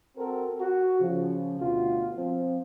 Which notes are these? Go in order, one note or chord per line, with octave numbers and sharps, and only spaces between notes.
C4 F#4 A4 A#4
F#4
C#3 F3
D2 B2 F4 F#4
F3 C4